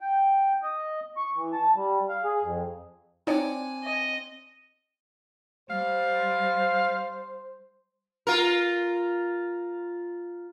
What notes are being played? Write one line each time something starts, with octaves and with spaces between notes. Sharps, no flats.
G5
D#5
C#6
E3
A5
G3
F5
G#4
F2
C4 D4 D#4 C#5 D5 G#5 D6
D#5
G3 C5 F5
F4 A#4